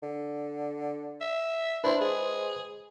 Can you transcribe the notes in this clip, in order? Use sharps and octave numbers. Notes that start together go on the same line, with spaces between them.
D3
E5
D4 E4 B4 C5
G#3 G#4